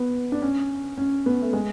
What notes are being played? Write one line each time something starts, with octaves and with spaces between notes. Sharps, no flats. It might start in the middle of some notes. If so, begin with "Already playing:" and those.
Already playing: B3
D4
C#4
C#4
B3
A3
G#3